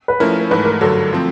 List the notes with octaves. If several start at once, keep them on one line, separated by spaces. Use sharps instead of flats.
B4
F3 A3 C#4 E4 A#4
G#2 E3 A3 B4
A#4
G2 D3 F#3 A4
F3 A3 C4